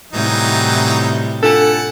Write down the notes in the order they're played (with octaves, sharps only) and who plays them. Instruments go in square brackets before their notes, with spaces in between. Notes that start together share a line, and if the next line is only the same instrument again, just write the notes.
[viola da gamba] A2 C3 G3 [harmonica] E3 F#3 D#4
[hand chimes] D4 F4 G#5 [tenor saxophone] A4 [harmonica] F#5